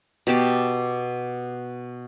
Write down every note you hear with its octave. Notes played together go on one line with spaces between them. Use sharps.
B2 G4 A5 D6